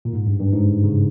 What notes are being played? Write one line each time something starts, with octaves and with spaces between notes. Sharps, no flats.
A#2
G#2
G2
G2
G#2
C#3